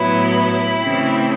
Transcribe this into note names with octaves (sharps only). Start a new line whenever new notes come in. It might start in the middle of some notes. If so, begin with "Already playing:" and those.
Already playing: A2 F#3 B3 E4
E4
C#3 E3 A3 C4